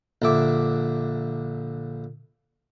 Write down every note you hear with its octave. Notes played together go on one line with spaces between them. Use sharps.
A#1 D3 E5 D6